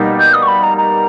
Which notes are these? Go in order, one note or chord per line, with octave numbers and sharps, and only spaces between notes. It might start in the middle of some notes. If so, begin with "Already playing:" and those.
Already playing: B2 G3 A#3 D#4 G4
G6
D#6
C#6
B5
A#5
A#5